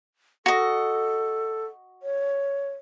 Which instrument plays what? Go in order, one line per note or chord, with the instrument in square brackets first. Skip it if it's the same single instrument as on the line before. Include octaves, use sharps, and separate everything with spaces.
[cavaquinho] F#4 D#5 [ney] A4
[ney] C#5